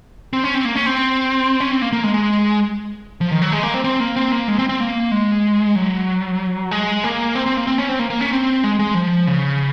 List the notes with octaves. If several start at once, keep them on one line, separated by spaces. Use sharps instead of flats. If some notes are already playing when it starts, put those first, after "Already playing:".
C4
C#4
C4
A#3
C#4
C4
C#4
C4
A#3
A#3
G#3
G#3
F3
D#3
F#3
G#3
A#3
C4
C4
A#3
C4
A#3
G#3
C4
C4
A#3
G#3
F#3
G#3
A#3
C4
C4
A#3
C4
C#4
C4
A#3
A#3
C#4
C4
G#3
G#3
F3
C#3